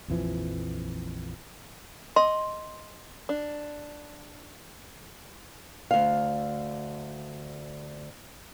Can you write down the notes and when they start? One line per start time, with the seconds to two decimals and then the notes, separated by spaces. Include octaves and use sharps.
0.08 A#1 F2 E3 F3
2.16 D#5 C6
3.29 D4
5.91 D2 F5